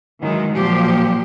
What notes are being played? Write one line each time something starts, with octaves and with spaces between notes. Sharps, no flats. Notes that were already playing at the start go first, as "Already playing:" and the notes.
D#3 E3 F#3 G#3
A#2 F3 F#3 G4